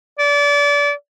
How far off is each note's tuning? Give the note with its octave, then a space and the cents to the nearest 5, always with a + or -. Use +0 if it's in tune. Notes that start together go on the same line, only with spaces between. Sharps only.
D5 -30